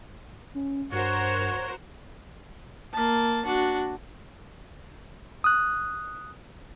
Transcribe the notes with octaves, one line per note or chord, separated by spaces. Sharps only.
C#4
G2 F#4 A#4 C5 C#5
A#3 A5
D4 F#4
D#6 F#6